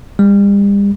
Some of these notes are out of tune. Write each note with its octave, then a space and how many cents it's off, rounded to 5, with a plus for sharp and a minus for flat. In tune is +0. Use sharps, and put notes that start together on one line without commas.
G3 +40